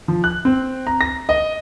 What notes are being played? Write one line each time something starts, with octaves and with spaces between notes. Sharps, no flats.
F3
F#6
C4
A#5
A#6
D#5